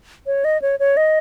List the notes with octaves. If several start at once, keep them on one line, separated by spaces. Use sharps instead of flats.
C#5
D#5
C#5
C#5
D#5